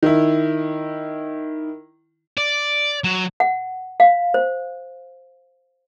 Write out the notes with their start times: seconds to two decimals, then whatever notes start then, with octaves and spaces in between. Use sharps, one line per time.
0.03 D#3 E4
2.38 D5
3.04 F#3
3.40 F#5
4.00 F5
4.34 C5